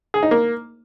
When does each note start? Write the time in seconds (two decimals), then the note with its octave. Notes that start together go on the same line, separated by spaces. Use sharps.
0.14 G#4
0.23 D#4
0.31 A#3